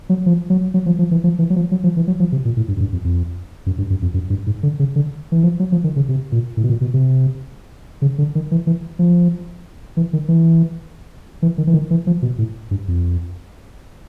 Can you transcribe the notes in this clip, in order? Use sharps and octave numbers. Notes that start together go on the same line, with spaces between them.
F#3
F3
F#3
F#3
F3
F3
E3
F3
E3
F#3
F3
F#3
F3
E3
F#3
F3
C3
A#2
A2
G2
F#2
G2
F2
F2
F#2
G2
F#2
F2
F#2
G2
G#2
D3
C#3
D3
E3
F3
F#3
F3
D#3
C#3
C3
A#2
A2
B2
A#2
B2
C3
C#3
D3
D#3
E3
E3
F3
E3
D#3
E3
E3
D#3
E3
D#3
E3
F3
B2
A2
G2
F2